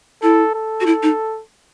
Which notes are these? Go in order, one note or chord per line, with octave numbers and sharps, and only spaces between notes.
E4 A4
A4
F#4
E4
D#4